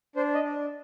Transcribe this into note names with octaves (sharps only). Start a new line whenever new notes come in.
D4 C5
D#5
D4